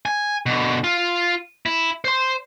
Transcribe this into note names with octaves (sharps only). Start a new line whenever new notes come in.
G#5
B2 D3
F4
E4
C5 C6